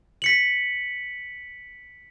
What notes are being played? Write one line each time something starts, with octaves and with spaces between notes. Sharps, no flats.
B6 C#7 F#7